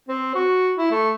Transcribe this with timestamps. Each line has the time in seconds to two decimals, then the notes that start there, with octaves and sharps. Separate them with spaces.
0.09 C4
0.35 F#4
0.77 E4
0.91 A3